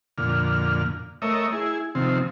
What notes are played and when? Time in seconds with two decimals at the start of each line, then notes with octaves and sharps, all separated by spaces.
0.18 F2 A#2 D3 F6
1.22 A3 A#4 C#5 D#5 E5
1.52 E4 G#4
1.95 C3 D#3 F3 C4